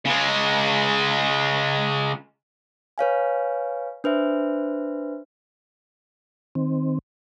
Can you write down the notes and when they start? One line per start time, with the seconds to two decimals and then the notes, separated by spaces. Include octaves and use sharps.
0.05 C#3 G#3
2.98 B4 C#5 F5 G#5
4.04 D4 B4 C5 E5
6.55 D#3 C4